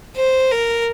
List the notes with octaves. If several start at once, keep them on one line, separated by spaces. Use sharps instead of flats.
C5
A#4